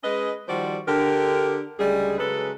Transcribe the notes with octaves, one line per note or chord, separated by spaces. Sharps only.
G#3 C#4 B4 D#5
D#3 F3 G3 F#4 C5 D5
D3 G4 A#4
D2 C#3 G3 G#3 G#4
C#3 F#3 G#3 A4 B4